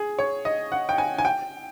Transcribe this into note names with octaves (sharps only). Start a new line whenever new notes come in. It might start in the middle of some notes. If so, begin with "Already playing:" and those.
Already playing: G#4
C#5
D#5
F#5
G5
G#5
G#5
G5